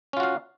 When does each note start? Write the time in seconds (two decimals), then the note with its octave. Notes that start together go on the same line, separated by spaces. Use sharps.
0.13 C#4
0.17 F4
0.20 F#4
0.23 F5